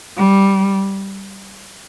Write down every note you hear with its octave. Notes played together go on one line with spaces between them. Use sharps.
G3